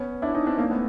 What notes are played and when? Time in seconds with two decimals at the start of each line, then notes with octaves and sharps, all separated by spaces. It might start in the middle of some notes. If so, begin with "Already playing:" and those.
Already playing: B3 C#4
0.22 D4 E4
0.34 C#4 D#4
0.46 C4 D4
0.58 A#3 C4
0.70 A3 B3